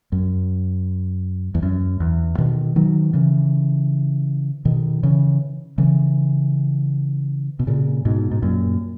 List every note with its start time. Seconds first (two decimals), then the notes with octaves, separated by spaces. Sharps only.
0.12 F#2
1.55 E2
1.63 F#2
2.00 E2
2.38 B2 D#3
2.76 D#3 F#3
3.13 C#3 E3
4.65 B2 D#3
5.03 C#3 E3
5.78 C#3 E3
7.59 B2
7.67 A#2 C#3
8.05 G#2 B2
8.31 G#2
8.43 F#2 A#2